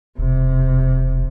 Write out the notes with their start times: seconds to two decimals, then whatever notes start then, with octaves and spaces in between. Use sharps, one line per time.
0.18 E1 C3